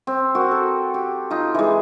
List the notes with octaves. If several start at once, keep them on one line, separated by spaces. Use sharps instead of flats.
C4
F#4 A#4
A4
G4
D#4 F4
E3 G#3